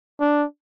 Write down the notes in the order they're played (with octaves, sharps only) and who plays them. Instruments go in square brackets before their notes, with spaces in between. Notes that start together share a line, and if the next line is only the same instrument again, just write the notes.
[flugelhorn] D4